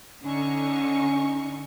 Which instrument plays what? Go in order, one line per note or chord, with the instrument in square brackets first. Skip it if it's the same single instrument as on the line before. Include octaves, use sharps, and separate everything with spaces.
[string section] D3 D#4 C#6 [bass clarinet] C#4